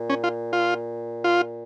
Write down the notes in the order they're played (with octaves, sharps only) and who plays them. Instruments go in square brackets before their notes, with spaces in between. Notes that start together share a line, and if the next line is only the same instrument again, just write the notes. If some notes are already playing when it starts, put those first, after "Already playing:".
Already playing: [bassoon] A#2
[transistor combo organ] C#4
F4
F4
F4